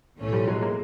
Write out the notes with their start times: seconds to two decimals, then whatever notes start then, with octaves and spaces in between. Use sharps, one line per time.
0.18 B1 A2 E3 A3 C#4
0.33 F3 G3
0.47 F#3 G#3
0.62 G#3 A#3